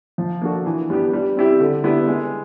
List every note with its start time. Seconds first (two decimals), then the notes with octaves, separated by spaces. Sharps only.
0.18 F3
0.42 A#3 D4 F#4 A4
0.66 E3
0.90 G3 B3 D4 G4
1.13 G3
1.36 C4 E4 G4
1.60 D3
1.84 G3 B3 E4 G4
2.07 G#3